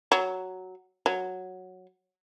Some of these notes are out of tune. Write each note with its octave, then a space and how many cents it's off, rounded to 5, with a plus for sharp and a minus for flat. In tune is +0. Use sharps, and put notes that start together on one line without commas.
F#3 +5
F#3 -5